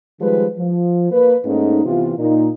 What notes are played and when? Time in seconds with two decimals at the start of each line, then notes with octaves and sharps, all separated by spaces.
0.21 D#3 F3 G3 G#3 B4
0.58 F3
1.12 A#3 B4
1.45 G#2 A3 A#3 C#4 D#4
1.85 C3 E3 B3 F4
2.18 A#2 A#3 D#4